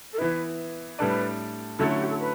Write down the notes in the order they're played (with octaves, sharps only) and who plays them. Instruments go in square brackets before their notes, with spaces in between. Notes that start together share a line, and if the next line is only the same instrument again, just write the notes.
[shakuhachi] A4
[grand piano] E3 B3 E4 [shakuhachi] B4
[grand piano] A2 G3 D4 A4 D5 [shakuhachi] B4
[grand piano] D3 F#3 A3 C#4 E4 [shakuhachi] A4
[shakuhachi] F#4
G4
A4
B4